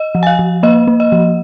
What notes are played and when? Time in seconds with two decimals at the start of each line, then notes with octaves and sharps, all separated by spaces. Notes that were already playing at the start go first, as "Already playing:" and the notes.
Already playing: D#5
0.15 F3
0.23 G#5
0.27 F5
0.39 F3
0.63 A#3 D#5
0.88 A#3
1.00 D#5
1.12 F3